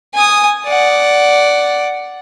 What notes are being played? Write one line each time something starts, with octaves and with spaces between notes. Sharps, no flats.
G#5 D#6
D5 F#5